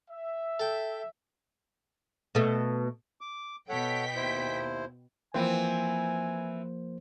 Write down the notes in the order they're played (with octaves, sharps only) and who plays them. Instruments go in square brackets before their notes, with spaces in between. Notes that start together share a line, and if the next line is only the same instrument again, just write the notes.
[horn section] E5
[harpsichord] A4 G5
[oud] B2 A3
[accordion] D6
[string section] B2 G5 B6 [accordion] A4 C#5 F#5
[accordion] D#2 E4 C5
[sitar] E3 C4 [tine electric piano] F3 A#3 C5 [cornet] G#5